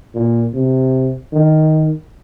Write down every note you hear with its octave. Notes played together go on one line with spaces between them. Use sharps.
A#2
C3
D#3